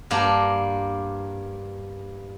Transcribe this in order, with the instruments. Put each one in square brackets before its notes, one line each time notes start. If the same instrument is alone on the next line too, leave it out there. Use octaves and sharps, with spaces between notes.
[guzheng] G2 A#3 D4